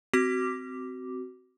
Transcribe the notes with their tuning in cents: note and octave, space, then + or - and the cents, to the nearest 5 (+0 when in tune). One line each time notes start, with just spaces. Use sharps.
C4 -15 F#4 +20 D6 +0